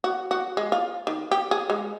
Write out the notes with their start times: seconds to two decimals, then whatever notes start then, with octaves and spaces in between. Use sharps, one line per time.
0.04 F#4
0.31 F#4
0.57 G#3
0.72 F4
1.07 D#3
1.31 G4
1.51 G#4
1.70 G#3